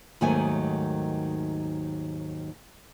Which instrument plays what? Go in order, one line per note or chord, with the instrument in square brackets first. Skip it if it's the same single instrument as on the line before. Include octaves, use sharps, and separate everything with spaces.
[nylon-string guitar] D#2 G#2 D#3 F#3 A3 G#5